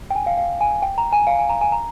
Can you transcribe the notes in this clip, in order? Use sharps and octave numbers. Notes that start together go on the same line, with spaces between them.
G5
G#5
F5
F5
G#5
G5
A#5
G#5
F5
G#5
A#5
G#5
A#5